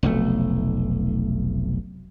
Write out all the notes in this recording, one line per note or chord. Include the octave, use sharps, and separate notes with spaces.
F1 B1 A3